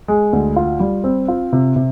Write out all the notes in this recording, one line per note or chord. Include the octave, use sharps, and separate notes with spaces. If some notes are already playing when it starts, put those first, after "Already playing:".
G#3
D2
F4
G3
C4
F4
C3
C3